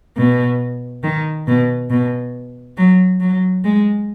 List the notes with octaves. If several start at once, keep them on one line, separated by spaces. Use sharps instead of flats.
B2
D#3
B2
B2
F#3
F#3
G#3